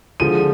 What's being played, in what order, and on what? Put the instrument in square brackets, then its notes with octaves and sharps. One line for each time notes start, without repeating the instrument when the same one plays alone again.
[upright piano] D3 F3 G#3 D#7